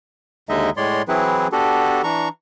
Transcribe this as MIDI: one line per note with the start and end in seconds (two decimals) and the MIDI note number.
0.49 0.70 39
0.49 0.70 50
0.49 0.70 56
0.49 0.70 63
0.49 0.70 75
0.49 0.70 76
0.77 1.02 45
0.77 1.02 56
0.77 1.02 73
0.77 1.02 74
0.77 1.02 84
1.08 1.48 52
1.08 1.48 54
1.08 1.48 60
1.08 1.48 64
1.08 1.48 68
1.08 1.48 71
1.52 2.02 59
1.52 2.02 62
1.52 2.02 66
1.52 2.02 67
1.52 2.02 69
2.03 2.29 52
2.03 2.29 62
2.03 2.29 82
2.03 2.29 85